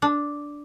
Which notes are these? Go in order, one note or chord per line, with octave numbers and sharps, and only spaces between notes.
D4